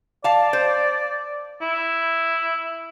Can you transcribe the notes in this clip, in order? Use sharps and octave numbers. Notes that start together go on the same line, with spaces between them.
D5 F5 A5
C5
E4